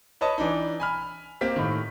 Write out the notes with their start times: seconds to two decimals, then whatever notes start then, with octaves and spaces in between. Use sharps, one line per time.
0.21 B4 C#5 D#5 A5 C#6 D#6
0.38 E3 D4 D#4
0.80 G#5 B5 F6
1.41 A#3 C4 G4 B6
1.56 A2 D#3